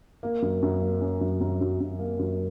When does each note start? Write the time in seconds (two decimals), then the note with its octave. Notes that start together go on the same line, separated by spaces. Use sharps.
0.23 A#3
0.42 F#2
0.63 F#2
0.81 A#3
1.01 C#4
1.21 F#2
1.41 F#2
1.61 F#2
1.80 F#2
1.99 A#3
2.19 F#2